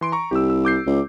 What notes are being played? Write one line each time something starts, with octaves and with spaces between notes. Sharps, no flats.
E3 C6 D7
A#5 C#6
C2 G4 E6
E6
D6 G6 C7
C#2